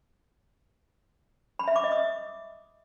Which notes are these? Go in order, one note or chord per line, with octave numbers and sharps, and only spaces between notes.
B5
E5
D6
D#5
D#6